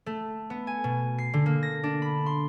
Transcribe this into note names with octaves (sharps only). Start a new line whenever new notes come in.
A3
B3
G#5
B2
C7
D3
A#3
A#6
D4
B5
C6